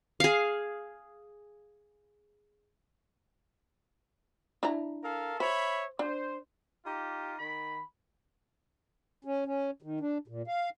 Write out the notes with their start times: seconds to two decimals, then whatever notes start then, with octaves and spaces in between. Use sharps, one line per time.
0.20 G#4 F5
4.63 D4 E4 A#5
5.03 A4 A#4 F5
5.40 C5 C#5 E5 B5
5.99 D4 C5
6.85 D#4 F4 G4
7.39 D#3 B5
9.25 C#4
9.46 C#4
9.82 D#3
10.00 D4
10.28 A#2
10.47 F5